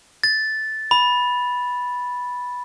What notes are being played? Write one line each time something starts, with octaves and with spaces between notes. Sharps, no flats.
A6
B5